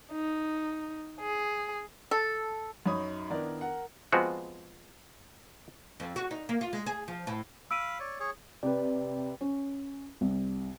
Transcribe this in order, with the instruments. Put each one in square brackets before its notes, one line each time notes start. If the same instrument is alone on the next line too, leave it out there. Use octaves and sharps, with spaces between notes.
[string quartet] D#4
G#4
[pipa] A4
[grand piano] F#2 D#4 C#5 B5 D#6
D#3 B3 D4 E4 A#4 D5
A#4 F#5
[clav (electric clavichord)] F3 G#3 B3 C4 F4 F#4
[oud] F2
F#4
D#4
A#3
F4
G#3
G#4
F3
A2
[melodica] F5 B5 [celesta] E6 D7 D#7
[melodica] C#5 D5
G#4 C#5
[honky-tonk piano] C3 [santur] G4 B4 [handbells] D5
[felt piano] C#4
C2